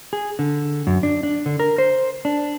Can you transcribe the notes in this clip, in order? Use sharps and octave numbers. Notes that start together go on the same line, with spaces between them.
G#4
D3
F#2
D4
D4
D3
A#4
C5
D4